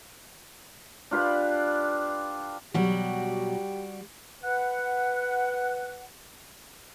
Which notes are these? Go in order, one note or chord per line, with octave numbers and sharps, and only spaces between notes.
D4 F4 G4 B4
B2 F#3 G3 F#4 G4
B4 F#5